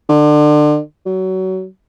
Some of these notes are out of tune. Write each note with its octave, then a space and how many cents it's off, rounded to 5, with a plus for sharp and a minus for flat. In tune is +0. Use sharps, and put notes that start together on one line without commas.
D3 +30
F#3 +25